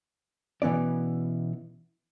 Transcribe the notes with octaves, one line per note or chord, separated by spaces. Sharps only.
B2 E3 B3 C#4 D5